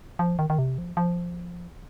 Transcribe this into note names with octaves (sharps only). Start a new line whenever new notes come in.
F3
D#3
D#3
C3
F3
F3